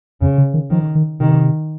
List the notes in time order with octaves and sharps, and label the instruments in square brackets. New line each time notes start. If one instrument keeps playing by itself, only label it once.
[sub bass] F2 [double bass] C#3
[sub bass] C#3
D#3
[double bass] D#3 [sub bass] F3
[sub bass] D#3
[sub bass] C3 [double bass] D#3